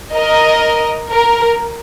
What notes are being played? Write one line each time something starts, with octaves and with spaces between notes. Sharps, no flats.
A#4 D#5
A#4